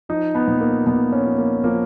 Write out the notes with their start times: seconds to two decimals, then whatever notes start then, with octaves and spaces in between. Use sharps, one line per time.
0.09 F3 D#4
0.35 B3
0.47 A#2
0.61 A#3
0.86 A#2 B3
1.13 C#4
1.25 F3
1.38 A#3
1.64 F3 A#3